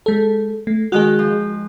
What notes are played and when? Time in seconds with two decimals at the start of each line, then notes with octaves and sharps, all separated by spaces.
0.06 G#3 A4
0.67 A3
0.92 D#3 G#3 F#4 G#4 F#6
1.19 F3